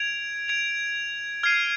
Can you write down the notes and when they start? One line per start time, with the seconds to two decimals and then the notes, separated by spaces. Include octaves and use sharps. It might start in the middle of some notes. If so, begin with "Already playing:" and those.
Already playing: G#6 D7 F7
0.48 G#6 D7 F7
1.43 F6 G#6 C7 D#7